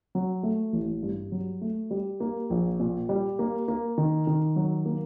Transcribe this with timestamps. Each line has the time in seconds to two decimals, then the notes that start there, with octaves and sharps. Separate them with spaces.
0.15 F#3
0.43 A3
0.73 A1
1.03 G2
1.32 F#3
1.61 A3
1.91 G3
2.20 A#3
2.50 A#1
2.80 A#2
3.09 G3
3.39 A#3
3.68 A#3
3.98 D#3
4.27 D#3
4.56 F#3
4.85 A#3